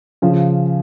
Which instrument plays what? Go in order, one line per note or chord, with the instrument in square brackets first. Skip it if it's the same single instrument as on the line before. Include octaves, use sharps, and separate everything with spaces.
[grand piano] C#3 F3